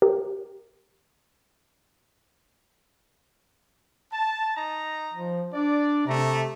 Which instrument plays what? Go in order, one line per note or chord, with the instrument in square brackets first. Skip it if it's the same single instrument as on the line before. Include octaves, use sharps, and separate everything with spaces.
[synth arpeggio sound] G4 A#4
[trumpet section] A5
D#4 A#5
[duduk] F3
[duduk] D4 [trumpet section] D5
[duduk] C3 [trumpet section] A3 A#5